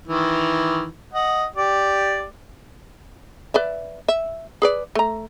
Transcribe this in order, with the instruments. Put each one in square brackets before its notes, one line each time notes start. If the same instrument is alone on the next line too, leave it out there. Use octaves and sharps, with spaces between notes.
[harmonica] D#3 E3
D#5 F#5
G4 D5
[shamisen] B4 D5 E5
E5
G#4 B4 D5
A3 A#5